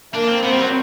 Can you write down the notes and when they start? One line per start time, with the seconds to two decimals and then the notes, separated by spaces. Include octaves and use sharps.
0.14 A#3 D4
0.28 C4
0.43 B3 C4
0.52 G3
0.61 F#3